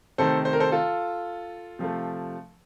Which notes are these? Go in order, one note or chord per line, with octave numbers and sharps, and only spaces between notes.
C3 D#3 A3 A4 C5
C5
A#4
A4 C5
F4 A4
C3 F3 A3